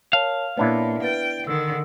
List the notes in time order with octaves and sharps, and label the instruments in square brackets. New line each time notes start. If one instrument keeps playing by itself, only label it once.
[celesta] A#4 C#5 A5 [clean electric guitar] F5
[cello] A#2 [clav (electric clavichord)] B3 D4 E4 [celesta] C#5
[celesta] B4 A6 [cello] G5
[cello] D3 D#3 [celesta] E6